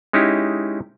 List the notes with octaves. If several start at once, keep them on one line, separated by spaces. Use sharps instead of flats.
G#3 C#4 D#4 E4 G4